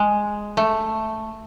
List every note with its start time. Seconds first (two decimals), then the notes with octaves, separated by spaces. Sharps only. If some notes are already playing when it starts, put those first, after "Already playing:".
Already playing: G#3
0.57 A3